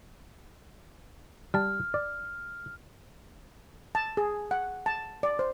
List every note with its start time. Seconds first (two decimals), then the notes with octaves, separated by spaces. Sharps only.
1.54 G3 A5 F6
1.94 D5
3.95 A5
4.17 G#4
4.51 F#5
4.86 A5
5.23 D5
5.39 C5